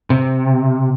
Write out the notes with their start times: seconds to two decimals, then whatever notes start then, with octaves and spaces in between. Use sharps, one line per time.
0.10 C3